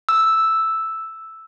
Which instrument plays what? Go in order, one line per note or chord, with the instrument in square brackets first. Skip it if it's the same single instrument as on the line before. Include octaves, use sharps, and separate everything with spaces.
[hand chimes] E6